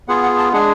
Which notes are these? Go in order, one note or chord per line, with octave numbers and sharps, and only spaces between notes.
B3 F4 G#4 F#5
F#5
A5
G#3 D4 G#4 F#5